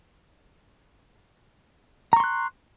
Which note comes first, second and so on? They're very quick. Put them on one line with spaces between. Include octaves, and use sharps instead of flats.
A#5 C#6 C6 F#6